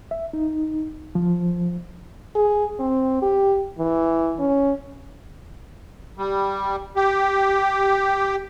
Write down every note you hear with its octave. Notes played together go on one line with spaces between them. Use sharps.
E5
D#4
F3
G#4
C4
G4
E3
C#4
G3
G4